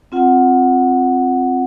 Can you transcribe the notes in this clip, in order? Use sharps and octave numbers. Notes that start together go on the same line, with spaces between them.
C4 F4 F#5